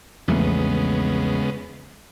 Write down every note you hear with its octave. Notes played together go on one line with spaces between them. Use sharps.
A#1 E2 C#3 G#3 A3 B3